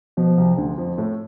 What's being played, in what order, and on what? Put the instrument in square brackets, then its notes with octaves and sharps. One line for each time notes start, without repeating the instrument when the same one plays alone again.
[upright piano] B2 [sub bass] F3
[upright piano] C2 C3
D2 D3
F2 F3
A2 A3